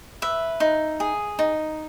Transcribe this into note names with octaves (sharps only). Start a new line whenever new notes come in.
B4 E5
D#4
G#4
D#4